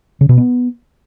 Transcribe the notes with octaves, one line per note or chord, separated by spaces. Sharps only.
C#3
B2
B3